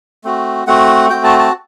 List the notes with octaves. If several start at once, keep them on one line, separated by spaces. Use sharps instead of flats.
A3 C4 F#4
A3 C4 F#4 F#5
A3 C4 F#4 G5
A5
A5